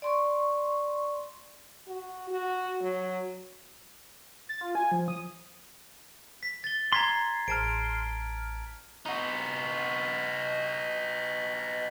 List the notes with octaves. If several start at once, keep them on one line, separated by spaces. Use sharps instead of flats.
D5 C6 C#6
F#4
F#4
F#3
A6
F4
G#5
F3
D#6
B6
A6 G7
A#5 C6 G#6 B6
A1 A5 F6 D7
D#4 F#4